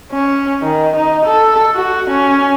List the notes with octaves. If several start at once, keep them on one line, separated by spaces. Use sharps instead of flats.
C#4
D#3
D#4
A4
F#4
C#4